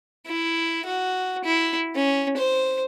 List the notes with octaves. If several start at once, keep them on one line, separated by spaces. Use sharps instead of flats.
E4
F#4
E4
C#4
C5